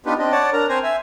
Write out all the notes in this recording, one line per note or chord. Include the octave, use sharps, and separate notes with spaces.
B3 D4 D#4 F4 G4 B4
C4 D4 D#5
C#5 D5 F#5 A5
D4 A#4 A#5
C4 C5 G#5 A#5
E5 G#5